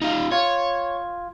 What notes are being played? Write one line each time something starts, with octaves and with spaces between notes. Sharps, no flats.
D#4 F4
F4 C#5 G#6